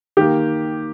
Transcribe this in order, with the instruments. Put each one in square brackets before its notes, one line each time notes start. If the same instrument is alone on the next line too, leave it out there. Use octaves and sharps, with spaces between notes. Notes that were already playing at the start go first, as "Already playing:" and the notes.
[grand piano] D#3 A#3 G4